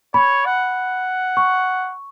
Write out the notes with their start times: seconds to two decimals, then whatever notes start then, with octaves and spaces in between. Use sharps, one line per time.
0.14 C#5 B5
0.45 F#5
1.37 C#6